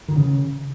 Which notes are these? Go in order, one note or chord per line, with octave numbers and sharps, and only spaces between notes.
D#3
C#3